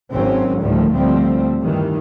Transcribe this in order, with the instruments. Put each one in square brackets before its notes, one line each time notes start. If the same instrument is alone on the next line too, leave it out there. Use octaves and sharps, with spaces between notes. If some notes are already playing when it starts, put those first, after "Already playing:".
[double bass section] G#1 F#3 C4 C#4
D2 A2 D#3 F3 G3 A3
D2 A2 F3 G3 A3 C4
G2 D#3 E3 G3